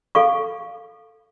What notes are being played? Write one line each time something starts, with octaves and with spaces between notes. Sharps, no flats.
A4 F5 C#6